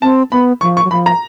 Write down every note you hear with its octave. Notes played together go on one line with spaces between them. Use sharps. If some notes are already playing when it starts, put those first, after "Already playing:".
C4 A5
B3 B5
F3 C#6
C#6
F#3
F3 B5
A#5